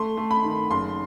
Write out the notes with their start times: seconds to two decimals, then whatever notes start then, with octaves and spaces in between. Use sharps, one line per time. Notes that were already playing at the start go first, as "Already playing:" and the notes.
Already playing: A3 C6
0.17 A3
0.31 B5
0.44 D#3
0.71 F#1 C6